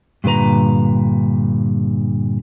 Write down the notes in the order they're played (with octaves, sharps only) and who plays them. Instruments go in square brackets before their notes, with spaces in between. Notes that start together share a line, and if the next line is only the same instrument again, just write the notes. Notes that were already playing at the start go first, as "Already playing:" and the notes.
[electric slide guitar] G2 A#2 D3 B4 A#5